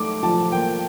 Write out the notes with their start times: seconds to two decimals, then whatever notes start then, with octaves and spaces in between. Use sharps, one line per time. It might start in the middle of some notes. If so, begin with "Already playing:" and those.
Already playing: A3 D#4 D6
0.23 F3 A5
0.52 A#3 G5